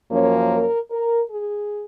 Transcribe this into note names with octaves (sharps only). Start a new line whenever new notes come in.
F#2 F3 A#3 C#4 C#5
A#4
A#4
G#4